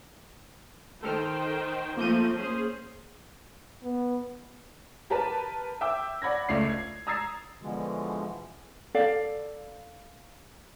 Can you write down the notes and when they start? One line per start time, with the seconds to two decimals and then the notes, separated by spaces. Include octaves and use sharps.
1.03 D#3 A4 C5 G5 F6
1.97 F3 A3 A#3 C4 G6 D#7
2.35 C#4 G#4 C5
3.83 B3
5.10 G4 A#4 B4 A5
5.81 E5 G5 D6 E6
6.22 D5 F#5 B5 G#6 A#6
6.49 C#2 A3 D5 C7
6.65 G#6 C7
7.07 A#5 D#6 E6 G#6 A6 C7
7.62 B2 D3 E3 F3 G#3
8.95 A4 D5 F5